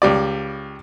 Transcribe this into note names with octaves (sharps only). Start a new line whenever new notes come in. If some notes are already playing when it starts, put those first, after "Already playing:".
C#2 G3 D5